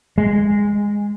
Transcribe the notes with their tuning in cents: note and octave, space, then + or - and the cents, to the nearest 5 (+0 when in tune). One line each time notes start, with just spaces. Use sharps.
G#3 -15